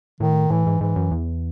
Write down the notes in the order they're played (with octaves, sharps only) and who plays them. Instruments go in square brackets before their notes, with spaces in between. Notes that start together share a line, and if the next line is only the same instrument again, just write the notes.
[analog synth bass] A2 [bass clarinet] D#3
[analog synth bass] A2 [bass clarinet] E3
[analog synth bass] G#2
[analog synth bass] G#2 [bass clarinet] E3
[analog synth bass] F#2
E2